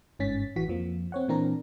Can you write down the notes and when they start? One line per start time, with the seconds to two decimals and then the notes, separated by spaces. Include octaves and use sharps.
0.19 G1 G#2 C#4 A6 B6
0.56 A1 E3 F#4 B6
0.68 F2 F3 A#3
1.12 C4 C#5 F#5
1.28 A#2 E3 C4 D4 A#4 A#5